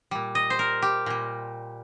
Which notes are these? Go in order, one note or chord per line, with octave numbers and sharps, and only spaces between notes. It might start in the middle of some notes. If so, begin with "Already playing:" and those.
A#2 G3
D#5
C5
A#4
G4
A#2 G3